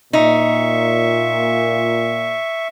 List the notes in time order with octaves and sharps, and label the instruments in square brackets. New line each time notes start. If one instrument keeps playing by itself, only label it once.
[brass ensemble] A#2 [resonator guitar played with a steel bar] D#4 [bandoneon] E5 C#6